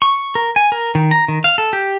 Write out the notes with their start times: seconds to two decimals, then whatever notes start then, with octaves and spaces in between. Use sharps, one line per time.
0.02 C#6
0.35 A#4
0.56 G#5
0.72 A#4
0.95 D#3
1.11 A#5
1.28 D#3
1.44 F5
1.58 A4
1.73 G4